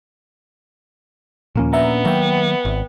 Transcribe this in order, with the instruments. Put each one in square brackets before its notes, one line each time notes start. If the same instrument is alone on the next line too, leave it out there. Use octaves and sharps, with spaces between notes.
[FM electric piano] D#2 F3 [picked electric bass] A#2 A#3 C#4
[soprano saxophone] B3 [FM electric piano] D4 E5 A#5
[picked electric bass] D#3 F#3 A#3 [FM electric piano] E5 G5
[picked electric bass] G#1